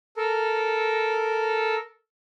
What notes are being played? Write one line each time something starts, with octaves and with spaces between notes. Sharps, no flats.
A4 A#4